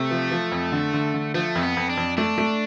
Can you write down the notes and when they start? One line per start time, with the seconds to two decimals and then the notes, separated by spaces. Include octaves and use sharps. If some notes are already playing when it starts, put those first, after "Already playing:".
Already playing: C3 A3
0.11 F3
0.31 F3
0.52 F2
0.72 D3
0.93 D3
1.14 D3
1.34 F3 A3
1.55 F2
1.62 B3
1.77 F2
1.90 D4
1.97 F2
2.17 A3 D4
2.38 A3